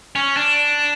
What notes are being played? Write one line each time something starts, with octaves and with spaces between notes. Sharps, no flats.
C#4
D4